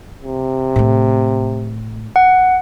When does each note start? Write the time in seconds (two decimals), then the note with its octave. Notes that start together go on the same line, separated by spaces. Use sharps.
0.23 C3
0.76 A2 A3
2.16 F#5